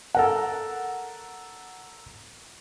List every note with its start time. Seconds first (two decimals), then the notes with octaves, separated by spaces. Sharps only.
0.15 A4 A#4 F#5